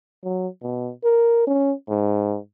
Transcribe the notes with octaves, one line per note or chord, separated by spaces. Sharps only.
F#3
B2
A#4
C#4
G#2